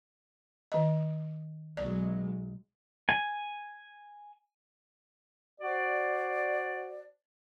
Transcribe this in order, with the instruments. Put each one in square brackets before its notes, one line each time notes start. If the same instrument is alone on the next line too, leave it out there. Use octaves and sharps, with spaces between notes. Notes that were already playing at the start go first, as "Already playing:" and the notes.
[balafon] D#3 D#5
[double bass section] B1 F#3 G#3 [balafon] D5
[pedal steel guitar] G#5
[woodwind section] F#4 C5 D5